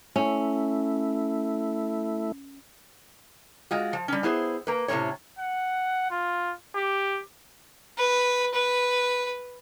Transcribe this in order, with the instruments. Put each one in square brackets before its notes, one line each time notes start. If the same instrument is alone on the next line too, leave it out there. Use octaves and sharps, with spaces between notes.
[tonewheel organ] A3 E4 [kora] C#4
[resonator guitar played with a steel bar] G#3 F4 F#4
F3
G3 C#4
B3 E4 G#4 C5
A#3 B4
A2 C3 E3 A#3 C#4 C#5
[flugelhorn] F#5
F4
G4
[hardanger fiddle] B4
B4